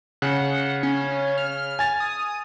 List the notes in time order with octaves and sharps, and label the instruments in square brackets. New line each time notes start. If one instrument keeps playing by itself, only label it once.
[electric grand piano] C#3 [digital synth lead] F#5
[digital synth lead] C#4
F6
[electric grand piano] G#5 A6
[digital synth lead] D#6